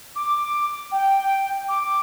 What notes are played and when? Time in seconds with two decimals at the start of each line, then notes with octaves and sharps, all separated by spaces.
0.15 D6
0.91 G5
1.68 D6